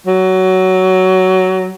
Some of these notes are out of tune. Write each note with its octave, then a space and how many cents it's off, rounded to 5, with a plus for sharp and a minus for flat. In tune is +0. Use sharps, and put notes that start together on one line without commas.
F#3 +15